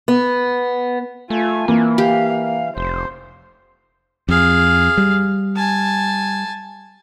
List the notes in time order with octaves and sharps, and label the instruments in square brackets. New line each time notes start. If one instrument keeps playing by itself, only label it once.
[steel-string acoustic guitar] B3
[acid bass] A3 [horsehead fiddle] F4 G#5
[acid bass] E3 [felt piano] A#3
[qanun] G4 [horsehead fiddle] F5
[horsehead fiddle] F5
[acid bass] F1 [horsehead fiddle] C5
[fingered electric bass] F2 [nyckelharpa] G#4 F5
[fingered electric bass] G3
[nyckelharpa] G#5 A5